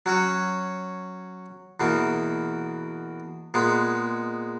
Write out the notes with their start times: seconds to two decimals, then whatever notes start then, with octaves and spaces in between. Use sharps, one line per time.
0.06 F#3 C#4 F#4
1.80 E2 B2 A#3
3.54 A#2 G#3 B3